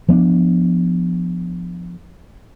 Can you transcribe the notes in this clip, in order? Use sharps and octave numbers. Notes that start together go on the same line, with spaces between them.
F3 B3 C#4 D4